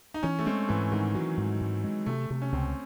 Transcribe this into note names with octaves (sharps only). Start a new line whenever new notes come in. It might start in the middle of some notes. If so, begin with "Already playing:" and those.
D#4
E3 C#4
A3
G#3 C4
G#2 E3
G#2 D#3
E3 F#3
G#2
G#2
G#3
C3 A3
C3 A3
C#4
C#2 C4